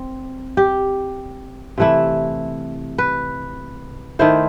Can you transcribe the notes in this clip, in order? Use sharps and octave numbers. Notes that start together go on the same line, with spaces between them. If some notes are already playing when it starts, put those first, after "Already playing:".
Already playing: C4
G4
C3 E3 A3 E4
B4
D#3 A3 E4 C5